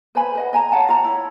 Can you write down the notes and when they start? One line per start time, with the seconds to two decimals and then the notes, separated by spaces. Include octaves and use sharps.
0.15 B4 C5 G#5 B5
0.35 B4 D#5 F#5
0.53 D#5 G#5 A#5
0.72 C#5 F5 F#5 A5
0.89 F4 A#5
1.04 E4 C#5